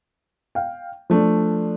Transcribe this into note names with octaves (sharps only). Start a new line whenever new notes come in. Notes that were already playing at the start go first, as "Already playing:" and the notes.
F5 G5
F3 A3 D4